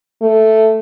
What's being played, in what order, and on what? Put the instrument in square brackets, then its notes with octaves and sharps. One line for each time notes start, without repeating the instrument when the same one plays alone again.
[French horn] A3